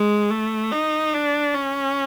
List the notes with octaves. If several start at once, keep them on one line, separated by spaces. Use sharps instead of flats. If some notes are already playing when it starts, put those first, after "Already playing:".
Already playing: G#3
A3
D#4
D4
C#4